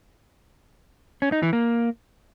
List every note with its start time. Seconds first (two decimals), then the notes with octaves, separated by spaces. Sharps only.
1.22 C#4
1.32 D#4
1.43 E3
1.53 A#3